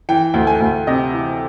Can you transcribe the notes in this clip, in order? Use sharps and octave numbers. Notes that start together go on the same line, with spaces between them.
E3 G5
D2
G#5
D2
C3 D#5
E3